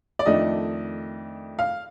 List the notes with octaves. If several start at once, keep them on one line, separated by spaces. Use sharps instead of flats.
D5
F2 D#3 A3 D4 D#5
F5